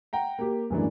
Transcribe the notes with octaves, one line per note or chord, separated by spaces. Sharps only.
F#5 G5 A#5
A#3 G4
F#2 A2 E3 G#3 A#3 D4